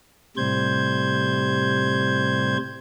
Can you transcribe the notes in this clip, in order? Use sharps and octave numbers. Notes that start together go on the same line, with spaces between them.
A2 C3 G3 C5 G6 G#6